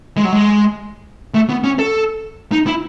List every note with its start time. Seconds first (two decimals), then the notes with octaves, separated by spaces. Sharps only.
0.17 G#3
0.25 F#3
0.33 G#3
1.35 A3
1.49 B3
1.64 C#4
1.79 A4
2.52 D#4
2.67 E4